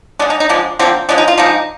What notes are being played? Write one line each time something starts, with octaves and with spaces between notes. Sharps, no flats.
D3 G#3 D4
D#4
D#4
D3 F3 G#3 D4
D3 F3 A#3 C4
D3 F3 G#3 D4
D#4
F4
D3 F3 G#3 D#4